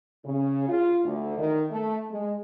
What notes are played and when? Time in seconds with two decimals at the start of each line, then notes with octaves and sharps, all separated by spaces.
0.25 C#3
0.68 F4
1.04 D2
1.38 D#3
1.70 A3
2.11 G#3